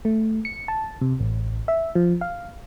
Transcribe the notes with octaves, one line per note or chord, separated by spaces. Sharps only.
A3
C#7
A5
C3
A1
E5
F3
F5